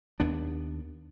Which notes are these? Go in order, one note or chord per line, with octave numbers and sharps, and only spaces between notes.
D#2 B3 D4